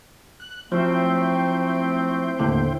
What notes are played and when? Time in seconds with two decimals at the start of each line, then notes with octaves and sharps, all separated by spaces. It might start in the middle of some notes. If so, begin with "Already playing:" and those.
0.40 F#6
0.72 F3 F#3 A3 C4 E4 C5 G5
2.39 D#2 A2 D3